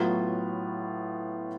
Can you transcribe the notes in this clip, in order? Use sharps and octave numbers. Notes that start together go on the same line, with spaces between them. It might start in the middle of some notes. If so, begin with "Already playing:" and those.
Already playing: A2 F#3 B3 F4